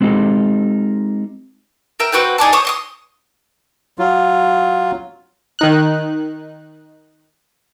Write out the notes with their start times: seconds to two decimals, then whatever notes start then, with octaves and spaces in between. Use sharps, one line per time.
0.01 G#3 C4 D#4 F4 G4 A4
2.00 A#4 E5 G5
2.12 C4 F#4 B4 G5
2.38 D#4 G#4 D5 A5
2.53 C5 C#5 C#6 D#6
2.65 C6 C#6 D#6
3.99 F#3 F4
5.59 D#3 D#4 F#6